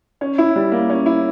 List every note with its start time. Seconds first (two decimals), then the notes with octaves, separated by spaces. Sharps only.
0.21 C#4
0.38 E4
0.56 G3
0.72 A#3
0.90 C#4
1.06 E4